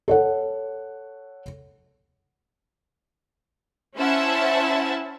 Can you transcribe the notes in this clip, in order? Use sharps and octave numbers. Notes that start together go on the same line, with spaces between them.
A4 C#5 F#5
C#4 E4 C5 E5 F#5 A5